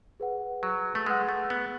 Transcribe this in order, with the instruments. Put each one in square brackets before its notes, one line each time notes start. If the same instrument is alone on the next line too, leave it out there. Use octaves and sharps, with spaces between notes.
[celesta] G#4 B4 F#5
[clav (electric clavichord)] F#3
A3
[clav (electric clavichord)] G#3 [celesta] G#4 B4 F#5
[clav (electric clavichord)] A3
B3